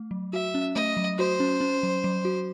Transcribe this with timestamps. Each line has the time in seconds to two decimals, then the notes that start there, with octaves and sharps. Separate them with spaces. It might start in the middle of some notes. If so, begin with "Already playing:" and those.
Already playing: A3
0.11 F#3
0.33 F#4 E5
0.54 C#4
0.75 A3 D#5
0.97 F#3
1.18 F#4 C5
1.40 C#4
1.61 C#4
1.83 F#3
2.04 F#3
2.25 F#4